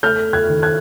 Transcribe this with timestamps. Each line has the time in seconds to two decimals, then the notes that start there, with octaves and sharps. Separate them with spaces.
0.03 A3 F6 G6
0.33 F#6 G#6
0.48 D#3
0.62 F#6 G#6